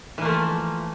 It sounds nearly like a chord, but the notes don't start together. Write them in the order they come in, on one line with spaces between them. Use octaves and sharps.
E3 A#3 A3 F3